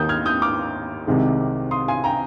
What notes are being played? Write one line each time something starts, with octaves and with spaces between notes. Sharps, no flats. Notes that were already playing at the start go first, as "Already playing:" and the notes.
Already playing: D#2 D#3 A#3 D#6 G6
F6 G#6
D#6 G6
D6 F6
C2 C3 D#3 G#3
C6 D#6
G#5 C6
G5 A#5